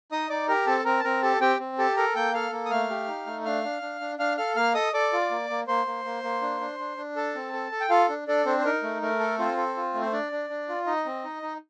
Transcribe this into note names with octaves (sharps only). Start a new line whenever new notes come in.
D#4 D#5 D#6
D#4 D5 D6
G4 A#4 A#5
C4 A4 A5
C4 A#4 A#5
A5
C4 A#4 A#5
G4 A4 A5
C4 G4 G5
C4
G4 A4 A5
A4 A#4 A#5
A#3 G5 G6
A4 F5 F6
A#3
D#6
A3 F5 F6
G4
D#4
A3
D4 F5 F6
D4
D4
D4
D4 F5 F6
A4 F5 F6
A#3 F5 F6
A4 D#5 D#6
A4 D5 D6
F4
A#3
A#3
A#3 C5 C6
A#3
A#3
A#3
D4
D4
D4
D4
A4 A5
C4
A4
A4
G5
F4 A4 F5
D4
D4 A4 D5
C4 D4 C5
C5
D#4 A#4
A3
A3 A#4
A4
C4 F4 C5
A4
F4
A3
C5
D4 D5
D4
D4
F4
D#4 D#5
C4
D#4
D#4